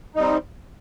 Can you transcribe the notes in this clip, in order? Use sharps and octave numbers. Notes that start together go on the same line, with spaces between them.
G3 C4 D#4